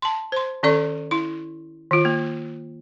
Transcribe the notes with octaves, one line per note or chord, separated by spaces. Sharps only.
A5 C6
C5 C6
D#3 C#4 A4 D5 C#6
E4 C6
D#3 F4
A#3